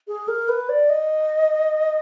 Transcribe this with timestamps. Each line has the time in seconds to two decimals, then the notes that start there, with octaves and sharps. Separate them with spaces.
0.08 G#4
0.28 A#4
0.49 B4
0.69 D5
0.89 D#5